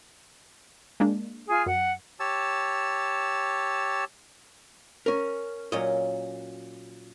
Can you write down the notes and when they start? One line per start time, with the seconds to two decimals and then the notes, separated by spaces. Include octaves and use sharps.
1.00 G#3 A#3 D4
1.48 F4 G#4 G#5
1.66 F#2 F#5
2.20 G4 C#5 A5 E6
5.06 C#4 A#4
5.72 A#2 F#3 C#4 D#5